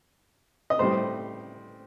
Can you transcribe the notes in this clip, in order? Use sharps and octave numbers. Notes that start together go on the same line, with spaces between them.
D#5
A2 G3 C5